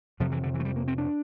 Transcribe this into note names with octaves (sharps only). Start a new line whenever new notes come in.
F2 C3 F3
E3
D3
E3
A3
G3
A#3
C4
D4